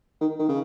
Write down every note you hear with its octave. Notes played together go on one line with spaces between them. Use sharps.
D#3
D#3
C#3